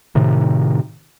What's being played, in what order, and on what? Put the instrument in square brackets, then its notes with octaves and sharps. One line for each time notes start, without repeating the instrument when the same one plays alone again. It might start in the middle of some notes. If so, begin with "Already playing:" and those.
[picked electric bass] A2 C3 D#3